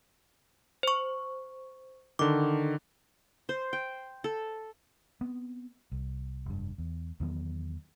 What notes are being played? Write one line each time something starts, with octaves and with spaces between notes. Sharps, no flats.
C5 C#6
D3 D#3 D6
C5
G5
A4
B3 C4
C2
F1 G2
E2
E2 D#3 F#3 B3